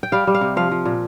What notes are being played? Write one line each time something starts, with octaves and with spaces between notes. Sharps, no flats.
G5
G3 F5
G3
F5
C3
F3 F5
F3
A#2